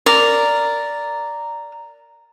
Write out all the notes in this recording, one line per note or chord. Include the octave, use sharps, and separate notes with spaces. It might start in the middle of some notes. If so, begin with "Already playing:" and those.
A#4 D5